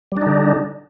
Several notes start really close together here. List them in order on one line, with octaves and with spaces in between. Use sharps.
G3 D4 D#4 D3